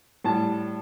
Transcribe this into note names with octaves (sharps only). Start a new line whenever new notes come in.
A2 G3 A5